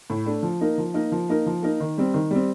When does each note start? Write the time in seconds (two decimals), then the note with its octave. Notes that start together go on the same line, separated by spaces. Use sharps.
0.10 A2
0.26 A3 D4
0.43 F3
0.61 A#3 D#4 A#4
0.78 F3
0.94 A#3 D#4 A#4
1.12 F3
1.29 A#3 D#4 A#4
1.46 F3
1.62 A#3 D#4 A#4
1.80 D#3
1.98 G3 C4
2.14 D#3
2.31 G3 C4